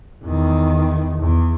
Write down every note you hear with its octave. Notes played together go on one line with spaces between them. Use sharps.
E2 D#3
E2